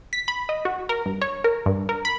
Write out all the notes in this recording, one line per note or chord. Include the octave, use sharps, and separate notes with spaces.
B6
B5
D#5
F#4
A#4
G2
C#5
A#4
G2
A#4
B5